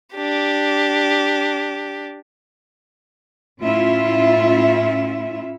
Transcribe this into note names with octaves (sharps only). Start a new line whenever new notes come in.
D4 G4
A2 C#4 E4 F4 E5